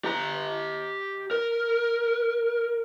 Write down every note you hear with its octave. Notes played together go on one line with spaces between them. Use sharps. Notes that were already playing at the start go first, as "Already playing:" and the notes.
G4 A#5
A#4